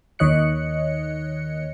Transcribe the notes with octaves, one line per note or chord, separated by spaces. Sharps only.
D#2 D#3 C#5 D#5 F#6 C#7